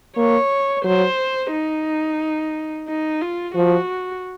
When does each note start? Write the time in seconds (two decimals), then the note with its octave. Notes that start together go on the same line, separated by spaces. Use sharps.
0.17 A#3 C#5
0.84 F#3 C5
1.52 D#4
2.88 D#4
3.21 F4
3.56 F3 F#4